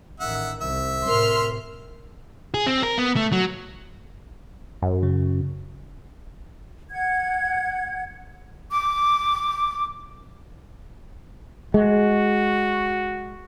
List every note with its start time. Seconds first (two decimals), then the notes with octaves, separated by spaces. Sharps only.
0.20 A1 D#3 E5 F#5
0.61 C2 E5
1.06 A2 C3 A#4 C6 F6
2.54 G#4
2.66 C4
2.83 A#4
2.98 B3
3.16 A3
3.32 F#3
4.82 F#2
5.03 C#3
6.91 F#5 G#6
8.70 D6
11.74 G#3 F#4